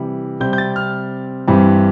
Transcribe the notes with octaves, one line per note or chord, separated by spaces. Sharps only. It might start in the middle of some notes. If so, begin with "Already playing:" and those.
Already playing: C3 E3 G3
C3 G3 C4 G6
G6
A6
F6
G2 E3 G3 C4